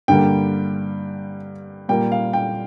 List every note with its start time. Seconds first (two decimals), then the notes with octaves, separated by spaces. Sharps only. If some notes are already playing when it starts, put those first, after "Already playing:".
0.08 G2 D3 G3 A#3 G5
1.89 A#2 G3 A#3 G5
2.12 F5
2.33 G5